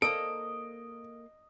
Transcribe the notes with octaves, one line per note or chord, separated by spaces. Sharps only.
A#3 A4 D#5 D7